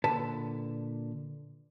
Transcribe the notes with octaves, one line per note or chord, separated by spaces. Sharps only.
A#2 D3 B4 A5